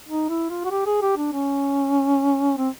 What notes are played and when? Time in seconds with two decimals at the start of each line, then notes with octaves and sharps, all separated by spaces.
0.09 D#4
0.29 E4
0.50 F4
0.65 F#4
0.71 G4
0.86 G#4
1.02 G4
1.18 D4
1.33 C#4
2.57 C4